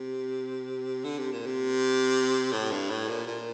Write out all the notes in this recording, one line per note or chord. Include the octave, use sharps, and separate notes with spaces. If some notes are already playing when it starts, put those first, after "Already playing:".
Already playing: C3
D3
C3
A#2
C3
A2
G2
A2
A#2
A#2